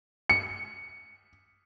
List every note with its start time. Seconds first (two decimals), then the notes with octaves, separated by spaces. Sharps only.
0.30 C#7